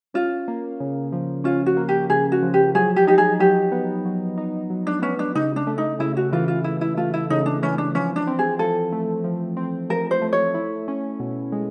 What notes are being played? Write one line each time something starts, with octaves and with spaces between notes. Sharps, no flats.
C#4 F4
A#3
C#3
F3
C#4 F4
F#4
A#3
G4
C#3 G#4
F#4
F3
G4
F#3 G#4
G4
D#4 G4
G#4
F#3 G4
B3
F#3
D#4
F#3
D4
B3 C#4
D4
C#3 D#4
D4
A3
D#4
C#3 E4
F#4
E3 F4
F4
C#3 E4
E4
A3 F4
E4
C#3 D#4
D4
E3 C#4
D4
F3 C#4
D4
C4
G#4
F3 A4
A3
F3
C4
F3 A#4
C5
A3
C#5
E4
C#4
B2
G#3